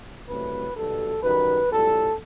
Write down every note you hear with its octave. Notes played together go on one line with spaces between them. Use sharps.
C2 C3 F#3 A3 B4
B1 B2 G3 A4
F#2 D#3 G3 B4
B1 A2 G3 A4